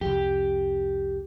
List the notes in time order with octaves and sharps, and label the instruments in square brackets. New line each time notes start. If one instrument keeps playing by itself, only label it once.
[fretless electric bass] C2 F2 [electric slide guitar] G4